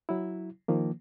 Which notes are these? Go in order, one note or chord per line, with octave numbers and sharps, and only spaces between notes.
F#3 E4
D#3 F3 A#3